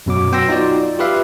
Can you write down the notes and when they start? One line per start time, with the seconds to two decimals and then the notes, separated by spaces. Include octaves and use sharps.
0.06 F#2 B2 F#3 D6
0.32 F#3 B3 G5 C6 E6 A#6
0.48 D#4 F4 F#4 D5
0.99 F4 G4 B4 E5 F5